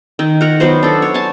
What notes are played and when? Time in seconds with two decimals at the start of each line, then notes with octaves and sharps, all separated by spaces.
0.19 D#3
0.41 A#4 F#5
0.60 F#3 B3 C5
0.83 D4 A4
1.02 C#5
1.14 G#5 A5